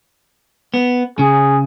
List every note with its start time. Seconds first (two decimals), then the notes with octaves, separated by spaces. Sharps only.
0.74 B3
1.19 C#3 G#4